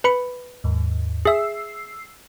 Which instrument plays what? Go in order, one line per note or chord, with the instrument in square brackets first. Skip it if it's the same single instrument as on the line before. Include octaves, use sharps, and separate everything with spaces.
[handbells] B4 B5 C#7
[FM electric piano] D#2 G#2
[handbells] G#4 E5 [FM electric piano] E6 C7